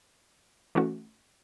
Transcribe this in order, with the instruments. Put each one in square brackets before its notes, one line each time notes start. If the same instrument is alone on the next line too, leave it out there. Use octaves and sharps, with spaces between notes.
[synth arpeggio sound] E3 A3 C#4 F#4